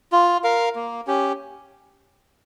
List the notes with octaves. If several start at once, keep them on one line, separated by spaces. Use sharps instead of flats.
F4
A#4 F5
A#3
C#4 G4